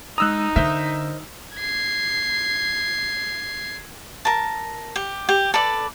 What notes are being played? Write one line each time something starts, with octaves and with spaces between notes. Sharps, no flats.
G#3 D#4 A#5 D#6 E6 F#6
D3 A#4 C5 D#5 E5
G#6 C7
A#4 A5
G4
G4
A4 B4 D5 D6